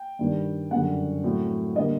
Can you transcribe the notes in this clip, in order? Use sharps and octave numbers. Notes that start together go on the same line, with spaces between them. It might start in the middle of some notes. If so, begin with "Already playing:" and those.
Already playing: G5
G2 D#3 G3
F#2 D3 G3 F#5
A2 F#3 C4
D3 G3 A#3 D#5